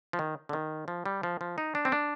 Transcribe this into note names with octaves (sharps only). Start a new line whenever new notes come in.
F3
D#3
D3
D#3
F3
G3
F3
F3
D#4
D4
C4
D4